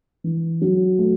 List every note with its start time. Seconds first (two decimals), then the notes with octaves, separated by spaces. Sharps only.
0.24 E3
0.62 F#3
0.99 A3